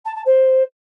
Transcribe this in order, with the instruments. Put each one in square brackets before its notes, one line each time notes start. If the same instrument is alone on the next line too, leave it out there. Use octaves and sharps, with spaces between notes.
[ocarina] A5
A5
C5